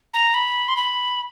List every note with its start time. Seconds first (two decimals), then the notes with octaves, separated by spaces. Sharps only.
0.13 A#5
0.34 B5
0.68 C6
0.76 B5